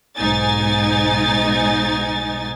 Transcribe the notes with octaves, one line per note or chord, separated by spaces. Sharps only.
B1 G#2 D#4 G#5 A6